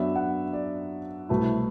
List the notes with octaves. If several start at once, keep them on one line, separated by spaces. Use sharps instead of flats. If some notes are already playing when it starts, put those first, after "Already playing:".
Already playing: F#2 F#3 B3 D4 E5
F#5
D5
C2 B2 A3 E4 B4